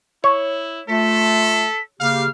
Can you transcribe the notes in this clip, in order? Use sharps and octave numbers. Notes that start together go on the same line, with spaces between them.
E4 C#5
A3 F4 A4 B6
C#3 A#3 G4 F5 F6